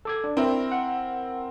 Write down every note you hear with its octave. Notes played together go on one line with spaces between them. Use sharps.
A4 D6 G#6
D4
C4 E4 A#4
F#5